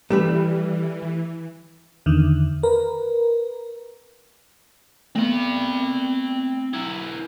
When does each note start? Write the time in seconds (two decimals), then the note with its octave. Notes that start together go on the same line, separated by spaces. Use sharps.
0.10 E3 G3 A3 G4 B4 E7
2.06 E2 D3 D#3
2.63 A#4 B4
5.15 A3 B3 C4 B5
6.74 F#3 E4